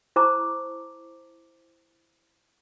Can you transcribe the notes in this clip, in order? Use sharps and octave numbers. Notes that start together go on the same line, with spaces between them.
E4 C5 A5 A#5 C#6 D6